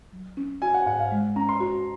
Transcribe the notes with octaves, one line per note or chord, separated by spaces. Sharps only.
F#3
C#4
F#4 G#5
F#5
G#2 F#5
F5
G#3
C#4 A#5
C6
F#4